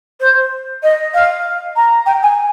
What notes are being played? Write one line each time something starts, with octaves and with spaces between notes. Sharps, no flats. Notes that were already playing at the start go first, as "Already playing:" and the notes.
C5
D#5
F5
A#5
G5
G#5